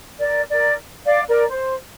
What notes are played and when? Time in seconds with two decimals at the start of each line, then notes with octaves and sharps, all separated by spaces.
0.18 A#4 D5
0.50 A#4 D5
1.05 D5 F5
1.27 A#4 D5
1.49 C5